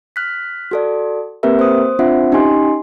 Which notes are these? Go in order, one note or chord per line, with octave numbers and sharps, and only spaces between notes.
F6 F#6 B6
F#4 A4 D5
A#3 C4 G4 A#4 B4 E5
C5 D#6
C4 D4 F4 C5 E5 F#5
C#4 D#4 G4 D#5 G#5 C6